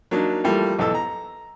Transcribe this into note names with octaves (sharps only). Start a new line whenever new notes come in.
F#3 A#3 D4 D#4
E3 F3 G3 A3 A#3
B1 E2 A4 E6
A#5